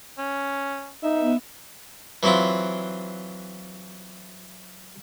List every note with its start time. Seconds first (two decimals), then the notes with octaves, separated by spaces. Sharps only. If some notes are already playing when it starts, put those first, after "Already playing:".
0.18 C#4
1.03 B3 D#4 E5
2.23 E3 F#3 C4 E4 F4